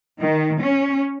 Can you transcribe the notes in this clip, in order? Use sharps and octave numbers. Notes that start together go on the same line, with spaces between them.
D#3
C#4